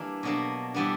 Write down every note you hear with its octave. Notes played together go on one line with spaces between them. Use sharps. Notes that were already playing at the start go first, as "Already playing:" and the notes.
Already playing: E3 G3 A#3 D4
B2 F#3 A#3 D4
E3 G3 B3 D4